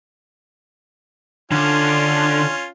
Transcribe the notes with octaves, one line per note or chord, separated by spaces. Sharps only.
D3 C#4 F4